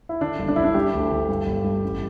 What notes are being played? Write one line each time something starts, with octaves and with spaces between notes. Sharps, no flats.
E4
D3 D4
G1
D4
G1 E4
D4
G3 G4
D2
D3
G2
G1
G3
A1